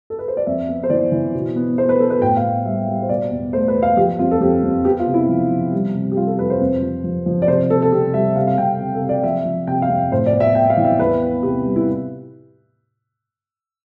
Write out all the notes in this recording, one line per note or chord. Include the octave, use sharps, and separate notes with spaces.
A4
B4
C5
D5
F2 E5
B3
C5
E3 D5
E3
B2
B3
B3 C5
B4
B3 A4
B4
A2 G5
F5
B3
G3 E5
G3
C5
B2 D5
E2
A3 C5
B4
E2
F5
F3 G4
F2 F4
A4
F2 G4
F2
B3 G4
F4
C3
E4
F3
F3
G3
C3
G4
G3 F4
A4
F2 B4
C5
F2
F3
F3
F3
D5
C3 C5
C3 A4
A4
C3 G4
G3 E5
C3 F5
F5
C3 G5
C3
A4
C3
D5
F3 E5
F3
C3 G5
F5
F2
A2 C5
D5
B3
E5
B3 G5
F5
E3
E5
E2 B4
B3
C3 G4
G3
E4